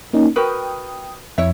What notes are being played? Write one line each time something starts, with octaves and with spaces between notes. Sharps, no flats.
A#3 C#4 D#4
F#4 A#4 B4 G5 D#6
F2 E4 C#5 E5